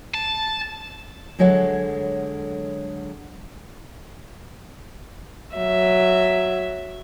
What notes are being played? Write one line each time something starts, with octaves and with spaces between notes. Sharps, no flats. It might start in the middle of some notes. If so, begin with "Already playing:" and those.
A5
D3 F#3 G#3 A4 C#5 F#5
F#3 E5